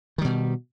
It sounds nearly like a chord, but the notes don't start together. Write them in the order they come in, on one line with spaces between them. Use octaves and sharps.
D#3 G3 B2